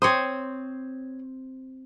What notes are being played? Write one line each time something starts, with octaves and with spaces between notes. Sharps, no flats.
C4 C5 C#5 C6 D#6